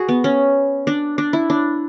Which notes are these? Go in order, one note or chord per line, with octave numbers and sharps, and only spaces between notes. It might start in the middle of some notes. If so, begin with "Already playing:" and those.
Already playing: F#4 G#4
B3
C#4
D4
D4
E4
D4